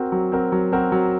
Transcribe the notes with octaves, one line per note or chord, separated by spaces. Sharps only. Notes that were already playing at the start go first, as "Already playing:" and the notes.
Already playing: C4 F#4 A#4
F#3
C4 F#4 A#4
F#3
C4 F#4 A#4
F#3